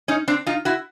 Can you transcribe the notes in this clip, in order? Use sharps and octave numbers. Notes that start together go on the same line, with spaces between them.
C#4 D#4
C4 D4
D#4 F4
E4 F#4